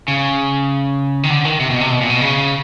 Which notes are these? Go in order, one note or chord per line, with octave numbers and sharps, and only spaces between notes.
C#3
D#3
D3
D#3
C3
B2
C3
B2
A#2
B2
C#3